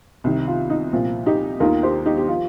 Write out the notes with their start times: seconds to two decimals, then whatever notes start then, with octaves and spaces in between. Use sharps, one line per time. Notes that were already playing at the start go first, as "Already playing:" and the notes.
0.24 C2 C3 D#3
0.47 F4
0.70 D#4
0.93 C2 A#2 F3
1.26 D#4 G4
1.60 D#2 D#3 F4 A#4
1.83 G4 C5
2.06 D#4 G4
2.17 G4
2.28 F3 F4